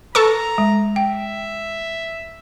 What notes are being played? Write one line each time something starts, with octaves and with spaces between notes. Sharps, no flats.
A4 B4 A#5 C#6
G#3
E5 G5